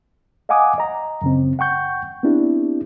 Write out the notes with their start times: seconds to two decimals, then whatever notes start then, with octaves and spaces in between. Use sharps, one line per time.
0.49 D#5 F5 F#5 G#5 D6 D#6
0.78 D#5 A#5
1.22 F#2 C#3 C4
1.59 F#5 G5 C#6 G6
2.23 B3 C4 D4 E4 G4